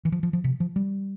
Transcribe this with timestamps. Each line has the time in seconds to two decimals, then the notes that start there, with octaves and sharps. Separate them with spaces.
0.05 E3
0.12 F3
0.23 F3
0.33 F3
0.44 C3
0.60 F3
0.76 G3